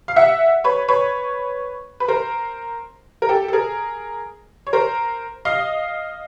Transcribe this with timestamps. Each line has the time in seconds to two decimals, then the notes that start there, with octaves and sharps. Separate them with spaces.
0.08 F5
0.16 E5 F#5
0.64 B4 C#5
0.88 B4 C#5
2.00 B4
2.08 A#4 C5
3.22 A#4
3.29 G4 A4
3.48 A4
3.53 G#4 A#4
4.67 C#5
4.73 A#4 C5
5.45 D#5 F5